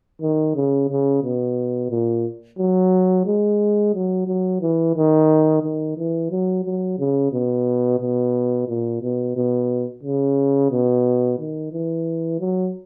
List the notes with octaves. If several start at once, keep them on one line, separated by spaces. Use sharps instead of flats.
D#3
C#3
C#3
B2
A#2
F#3
G#3
F#3
F#3
E3
D#3
D#3
E3
F#3
F#3
C#3
B2
B2
A#2
B2
B2
C#3
B2
D#3
E3
F#3